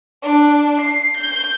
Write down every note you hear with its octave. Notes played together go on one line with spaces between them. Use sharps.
D4
C7
G6